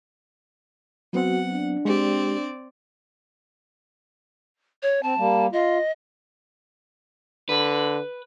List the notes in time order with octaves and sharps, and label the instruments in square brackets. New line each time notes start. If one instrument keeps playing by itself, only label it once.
[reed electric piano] F#3 B3 C4 [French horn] F#4 [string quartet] F#5
[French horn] D4
[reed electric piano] G#3 G4 [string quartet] C4 D5
[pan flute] C#5
[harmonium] C4 [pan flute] A5
[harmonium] G3 A#3
[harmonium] F4 [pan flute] D#5
[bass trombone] D3 [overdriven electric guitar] B4